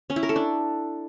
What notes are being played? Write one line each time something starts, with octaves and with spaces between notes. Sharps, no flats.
C#4
E4
A#4
A4
D4